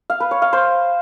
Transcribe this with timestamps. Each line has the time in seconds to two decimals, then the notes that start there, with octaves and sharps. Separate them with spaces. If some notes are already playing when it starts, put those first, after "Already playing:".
0.10 F5
0.20 B4
0.31 C#5
0.42 F5
0.53 C5